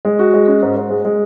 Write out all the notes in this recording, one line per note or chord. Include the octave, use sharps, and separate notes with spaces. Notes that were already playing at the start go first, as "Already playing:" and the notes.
G#3
F#4
G#3
C#4
G#2
G#2
G#3
G#3